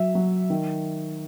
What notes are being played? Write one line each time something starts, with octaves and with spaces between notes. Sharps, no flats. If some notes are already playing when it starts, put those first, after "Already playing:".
Already playing: F#3 E5
F#3
D#3